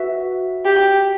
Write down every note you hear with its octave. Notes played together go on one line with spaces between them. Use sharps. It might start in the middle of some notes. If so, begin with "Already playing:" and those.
Already playing: F#4 B4 E5
G4